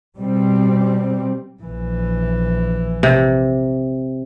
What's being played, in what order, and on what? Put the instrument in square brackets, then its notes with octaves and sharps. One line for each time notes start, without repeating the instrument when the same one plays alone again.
[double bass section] B2 G3 C4
[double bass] A#1 E3
[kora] C3